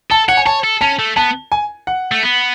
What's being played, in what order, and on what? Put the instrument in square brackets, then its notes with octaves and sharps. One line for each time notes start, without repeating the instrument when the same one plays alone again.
[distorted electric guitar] A4 [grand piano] A5
[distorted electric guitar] C#5 [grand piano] F#5
[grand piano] G#5
[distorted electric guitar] C#5 [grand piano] A5
[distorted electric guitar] A4
[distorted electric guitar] C#4 [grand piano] A5
[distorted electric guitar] A3
[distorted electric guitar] B3 [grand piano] A5
[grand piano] G#5
F#5
[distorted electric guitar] A3
B3